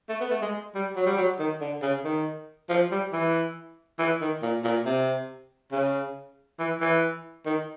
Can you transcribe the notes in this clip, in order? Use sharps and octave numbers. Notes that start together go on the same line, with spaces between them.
A3
B3
A3
G#3
G3
F#3
G3
F#3
D#3
D3
C#3
D#3
F3
G3
E3
E3
D#3
A#2
A#2
C3
C#3
E3
E3
D#3